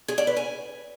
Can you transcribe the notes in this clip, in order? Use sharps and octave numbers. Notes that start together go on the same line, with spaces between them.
G#4
D5
B4
G#5